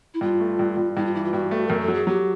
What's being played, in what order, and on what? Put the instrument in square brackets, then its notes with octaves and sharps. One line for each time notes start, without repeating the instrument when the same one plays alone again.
[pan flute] E4
[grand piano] G2 [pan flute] F4
[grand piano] A3
G2
G2
[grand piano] G2 [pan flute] E4
[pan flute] F4
[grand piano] E3 [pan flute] E4
[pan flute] F4
[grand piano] G2 [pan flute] F#4
[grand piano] A3
[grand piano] F#2 [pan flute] A#4
[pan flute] A4
[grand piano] F#3
[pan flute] G#4
[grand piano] F#3 [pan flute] G4